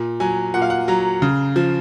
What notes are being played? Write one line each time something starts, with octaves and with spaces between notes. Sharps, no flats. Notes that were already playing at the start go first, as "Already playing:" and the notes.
Already playing: A#2
F#3 G#5
A#2 F#5
F5
F#5
F#3 A#5
C#3
F3